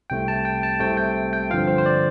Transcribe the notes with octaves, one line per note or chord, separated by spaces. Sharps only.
C2 C3 A3 G5
A5
G5
A5
C2 C3 A3 G5
G5
G5
G2 D3 F3 C4 F4 F5
C5
C5
D5